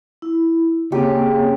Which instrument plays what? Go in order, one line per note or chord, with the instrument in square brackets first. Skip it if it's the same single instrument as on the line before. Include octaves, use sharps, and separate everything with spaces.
[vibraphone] E4
[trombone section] C#3 [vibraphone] A#3 C4 [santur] G4